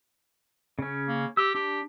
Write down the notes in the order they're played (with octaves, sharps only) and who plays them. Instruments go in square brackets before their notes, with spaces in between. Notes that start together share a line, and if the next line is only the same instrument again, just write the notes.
[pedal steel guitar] C#3 C#4
[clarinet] A#3
[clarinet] G4 [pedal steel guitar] E6
[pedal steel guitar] D4 [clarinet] G4